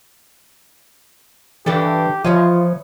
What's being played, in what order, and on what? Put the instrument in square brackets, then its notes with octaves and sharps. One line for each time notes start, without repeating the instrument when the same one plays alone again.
[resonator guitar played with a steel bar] G2 D4 A4 [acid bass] E3 [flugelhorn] G4
[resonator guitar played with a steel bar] E3 C#5 D#5 [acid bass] F3 [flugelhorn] F4